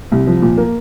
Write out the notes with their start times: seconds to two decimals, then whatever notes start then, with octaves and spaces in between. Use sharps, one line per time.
0.12 C2
0.27 F3
0.42 A#2
0.58 A#3